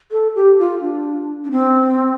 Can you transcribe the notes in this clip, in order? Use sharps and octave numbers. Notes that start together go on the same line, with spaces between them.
A4
G4
F4
D4
D4
C4